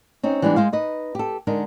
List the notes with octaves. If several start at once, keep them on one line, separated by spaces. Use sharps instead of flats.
C4 C#4 D#4
E3 G3 G#3 B3 C#4 D4
G#3 C5 F5
D#4 B4 D#5
G4 A4
D3 G#3 D#4 A#4